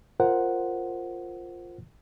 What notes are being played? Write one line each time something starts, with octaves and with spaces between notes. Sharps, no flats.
F4 A#4 C5 F#5